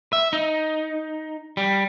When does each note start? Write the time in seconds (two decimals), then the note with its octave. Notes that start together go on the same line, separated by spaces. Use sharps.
0.13 E5
0.33 D#4
1.57 G3